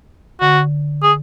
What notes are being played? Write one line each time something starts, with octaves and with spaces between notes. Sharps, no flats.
D3 F#4
G#4